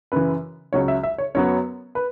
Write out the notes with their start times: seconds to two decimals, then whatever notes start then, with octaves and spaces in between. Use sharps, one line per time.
0.12 F#2 C#3 E3 B4
0.73 C#2 C#3 F#3 C#5
0.88 E5
1.03 E5
1.18 C#5
1.35 F#2 F#3 B3 C#5
1.95 B4